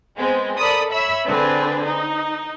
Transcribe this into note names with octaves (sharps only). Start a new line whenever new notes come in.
G#3 B3 C4
A4 A#4 D5 B5 D#6
C#5 E5 B5 E6
D3 C4 D4 G#4 B4
D#4